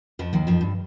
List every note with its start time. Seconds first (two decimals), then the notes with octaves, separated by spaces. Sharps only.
0.19 F2 F3
0.33 D#2 D#3
0.47 F2 F3
0.61 G2